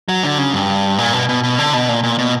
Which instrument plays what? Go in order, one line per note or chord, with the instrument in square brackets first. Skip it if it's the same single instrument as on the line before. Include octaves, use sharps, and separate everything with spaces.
[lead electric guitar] F#3
D3
C#3
G2
A#2
B2
B2
B2
D3
B2
A#2
A#2
B2